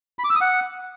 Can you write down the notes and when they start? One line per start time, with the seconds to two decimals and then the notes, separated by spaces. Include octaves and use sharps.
0.19 B5
0.24 D6
0.30 E6
0.35 D#6
0.41 F#5